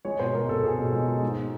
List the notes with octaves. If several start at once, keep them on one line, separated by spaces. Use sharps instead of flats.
G#3 C#5
B2 C5
G#3 A#4
B2 A4
B2 G#4
B2
G#3
G#3
G#2